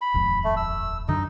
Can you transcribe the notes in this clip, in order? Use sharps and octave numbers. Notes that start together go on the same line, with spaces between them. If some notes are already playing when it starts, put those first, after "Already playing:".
B5
D#1 G#1 F2
A3
E6
F#2 D3 D#4 D#5